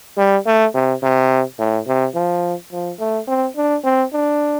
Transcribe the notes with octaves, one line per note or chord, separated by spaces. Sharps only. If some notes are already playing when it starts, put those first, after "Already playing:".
G3
A3
C3
C3
A2
C3
F3
F3
A3
C4
D4
C4
D4